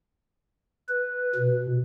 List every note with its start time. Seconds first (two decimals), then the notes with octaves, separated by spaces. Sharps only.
0.89 B4
1.35 B2